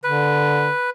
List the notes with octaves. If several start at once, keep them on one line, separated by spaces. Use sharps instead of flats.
D3 B4